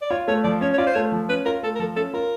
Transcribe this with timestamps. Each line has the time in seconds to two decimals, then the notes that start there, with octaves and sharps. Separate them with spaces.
0.02 D5
0.11 F4 C#5
0.28 A3 C#5
0.44 F3 D5
0.61 C#4 C#5
0.74 C#5
0.78 F4 D5
0.87 C5
0.95 A3 C#5
1.12 F3
1.29 C#4 B4
1.45 F4 A#4
1.63 A3 A4
1.75 A#4
1.79 F3 A4
1.96 C#4 A4
2.14 F4 A#4